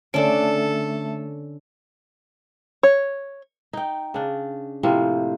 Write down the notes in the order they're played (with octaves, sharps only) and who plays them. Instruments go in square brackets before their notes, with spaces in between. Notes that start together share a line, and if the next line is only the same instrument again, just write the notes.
[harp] D3 [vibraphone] A3 E5 [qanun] C#4 D4 [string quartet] A4
[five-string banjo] C#5
[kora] D#4 G5
C#3 D4
A2 C3 F3 A#3